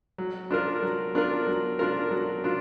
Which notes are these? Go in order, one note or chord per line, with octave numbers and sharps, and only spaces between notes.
F#3
D4 F4 A#4
F#3
D4 F4 A#4
F#3
D4 F4 A#4
F#3
D4 F4